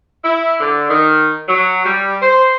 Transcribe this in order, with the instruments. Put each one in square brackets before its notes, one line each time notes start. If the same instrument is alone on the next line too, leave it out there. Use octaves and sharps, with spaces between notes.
[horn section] E4
D3
D#3
F#3
G3
C5